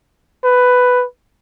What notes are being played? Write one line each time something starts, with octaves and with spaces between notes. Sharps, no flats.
B4